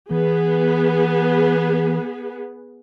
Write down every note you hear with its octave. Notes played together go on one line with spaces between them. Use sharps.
E3 B3 G#4 B4